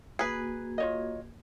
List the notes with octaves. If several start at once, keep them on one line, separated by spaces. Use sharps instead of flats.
A#3 F#4 G#4 B4
F4 C#5 D#5